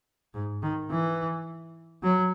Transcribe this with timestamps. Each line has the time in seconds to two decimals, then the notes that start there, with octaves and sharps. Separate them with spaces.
0.34 G#2
0.63 D#3
0.91 E3
2.03 F#3